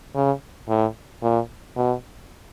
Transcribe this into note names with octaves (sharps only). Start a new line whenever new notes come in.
C#3
A2
A#2
B2